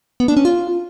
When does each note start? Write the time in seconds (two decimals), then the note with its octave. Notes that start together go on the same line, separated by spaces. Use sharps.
0.20 B3
0.28 D4
0.37 C#4
0.45 F4